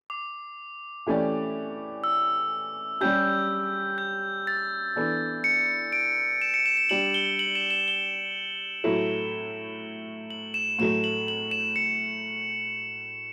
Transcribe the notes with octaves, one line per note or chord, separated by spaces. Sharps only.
D6
E3 A3 C#4 G4 D5
E6
G3 C#4 G4 G6
G6
A6
E3 B3 D4 A4
C#7
D7
E7
C#7
E7
E7
G3 D4 G4 F#7
G7
F#7
E7
E7
G7
A2 F#3 A3 E4
F#7
E7
A2 F#3 A3 E7
F#7
F#7
E7
C#7